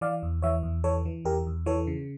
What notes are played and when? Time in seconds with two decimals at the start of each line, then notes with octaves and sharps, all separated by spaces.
0.01 E3 D5 F5
0.23 E2
0.42 E3 C#5 E5
0.63 E2
0.84 E3 A4 C#5
1.05 E3
1.25 E2 G4 A#4
1.47 E2
1.66 E3 A4 C#5
1.87 C#3